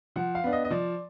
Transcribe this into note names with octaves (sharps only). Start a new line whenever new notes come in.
F3 F#5
F5
B3 D4
D#5
D#5
F3 D5